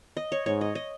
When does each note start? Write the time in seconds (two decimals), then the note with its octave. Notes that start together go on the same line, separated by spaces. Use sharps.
0.17 D#5
0.32 C#5
0.46 G#2 C#5
0.61 D#5
0.75 D#5